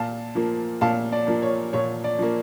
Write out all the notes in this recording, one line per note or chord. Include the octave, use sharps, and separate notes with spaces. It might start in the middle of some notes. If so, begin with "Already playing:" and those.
Already playing: A#2 F5 A5
F3 A#3
A#2 F5 A5
D5
F3 A#3
C#5
A#2 C#5
D5
F3 A#3